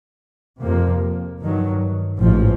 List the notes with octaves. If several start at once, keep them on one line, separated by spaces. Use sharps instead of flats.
F2 C3 F3 A#3
G2 D#3 F#3
A1 G#2 F3